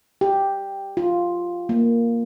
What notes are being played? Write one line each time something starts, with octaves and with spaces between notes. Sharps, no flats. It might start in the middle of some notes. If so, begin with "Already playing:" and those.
G4
F4
A#3